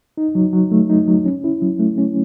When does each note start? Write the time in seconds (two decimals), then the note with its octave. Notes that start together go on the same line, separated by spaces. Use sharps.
0.17 D#4
0.35 F#3
0.53 F#3
0.71 A3
0.90 D#4
1.08 F#3
1.26 C#4
1.44 E4
1.62 F#3
1.80 A3
1.98 C#4